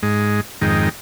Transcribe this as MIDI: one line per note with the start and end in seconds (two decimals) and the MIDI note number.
0.03 0.41 44
0.03 0.41 56
0.61 0.89 41
0.61 0.89 44
0.61 0.89 51
0.61 0.89 56
0.61 0.89 63
0.61 0.89 79